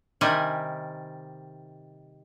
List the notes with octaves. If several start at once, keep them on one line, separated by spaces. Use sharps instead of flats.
C3 D#3 G3 G#5